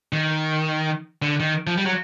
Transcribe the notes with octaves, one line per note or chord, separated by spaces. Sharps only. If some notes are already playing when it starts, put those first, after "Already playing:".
D#3
D3
D#3
F3
G3
F#3